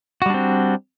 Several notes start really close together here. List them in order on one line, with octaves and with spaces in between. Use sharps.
F#4 G3 D4 C4